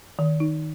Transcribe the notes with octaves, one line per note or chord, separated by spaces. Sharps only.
D#3
D#4